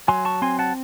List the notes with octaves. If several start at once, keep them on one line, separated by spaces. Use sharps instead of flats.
F#3 G#5 C6
A5 C#6
C4 G#5 C6
F#5 A5